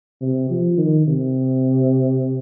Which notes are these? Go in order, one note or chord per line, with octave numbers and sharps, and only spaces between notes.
C3
F3
D#3
C3